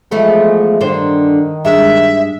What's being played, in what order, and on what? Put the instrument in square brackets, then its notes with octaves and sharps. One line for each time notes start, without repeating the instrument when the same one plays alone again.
[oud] E3 A3 B3 [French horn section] F3 G#3
[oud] G2 D3 C5 [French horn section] D#3
[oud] G2 G#3 [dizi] E5